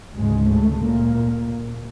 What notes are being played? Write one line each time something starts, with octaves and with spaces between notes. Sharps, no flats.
D2 G#2 C#3 G#3
A2 A3
A#2 A#3